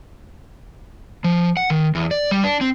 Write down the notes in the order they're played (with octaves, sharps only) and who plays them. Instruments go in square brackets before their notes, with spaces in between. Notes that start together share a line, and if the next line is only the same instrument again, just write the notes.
[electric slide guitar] F3
F#5
D#3
E2
D5
G3
D4
C4